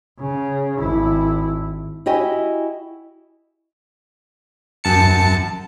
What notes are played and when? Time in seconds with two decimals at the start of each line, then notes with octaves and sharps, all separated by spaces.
0.19 C#3
0.80 G#1 E4
2.06 E4 F#4 G4 D#5 G#5
4.84 F#2 A5 C#7